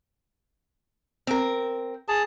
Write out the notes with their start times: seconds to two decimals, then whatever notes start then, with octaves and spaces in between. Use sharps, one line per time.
1.27 C4 A#4
2.08 G#4 A5